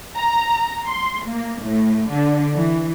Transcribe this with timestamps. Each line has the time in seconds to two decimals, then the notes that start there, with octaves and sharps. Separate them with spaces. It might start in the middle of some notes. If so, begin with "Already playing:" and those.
0.16 A#5
0.86 C6
1.27 A#3
1.62 A2
2.10 D3
2.54 E3